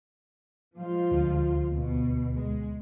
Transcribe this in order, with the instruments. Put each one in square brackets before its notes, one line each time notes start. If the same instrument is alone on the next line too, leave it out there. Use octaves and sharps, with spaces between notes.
[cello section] F3 G#3 F4
[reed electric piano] D2
[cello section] B2
G#3